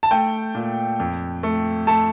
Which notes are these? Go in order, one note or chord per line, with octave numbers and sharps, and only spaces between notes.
A5
A3 G5
A#2
F2
A3
A3 A5